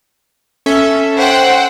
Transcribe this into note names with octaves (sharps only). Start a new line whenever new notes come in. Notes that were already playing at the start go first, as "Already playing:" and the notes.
C#4 A4 E5
C5 F#5 G5